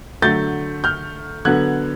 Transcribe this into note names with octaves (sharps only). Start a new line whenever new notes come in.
D3 F#3 A3 G6 A6
F6 G6
D3 F#3 B3 F#6 G#6